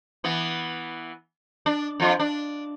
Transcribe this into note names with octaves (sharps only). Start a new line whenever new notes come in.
E3 B3
D4
F2 F4
D4